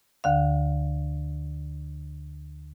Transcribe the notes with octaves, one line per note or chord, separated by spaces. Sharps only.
D2 D3 F5